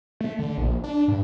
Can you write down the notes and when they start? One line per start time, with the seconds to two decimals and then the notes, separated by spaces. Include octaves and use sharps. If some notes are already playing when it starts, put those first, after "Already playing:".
0.21 A3
0.39 D3
0.58 A#1
0.84 D4
1.08 G2